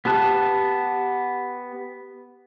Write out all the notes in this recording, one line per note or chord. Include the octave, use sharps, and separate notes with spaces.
B3 G4 A5 F#6